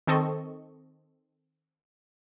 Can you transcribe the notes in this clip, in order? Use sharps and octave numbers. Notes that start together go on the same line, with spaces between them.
D#3 C4 A4 D#5 C#6